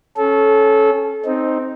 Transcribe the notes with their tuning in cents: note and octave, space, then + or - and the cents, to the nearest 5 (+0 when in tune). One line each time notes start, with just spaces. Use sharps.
C#4 -5 A4 -25
C4 +0 D#4 +0